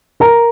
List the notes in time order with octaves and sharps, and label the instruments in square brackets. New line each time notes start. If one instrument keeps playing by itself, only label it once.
[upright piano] A#4 A#5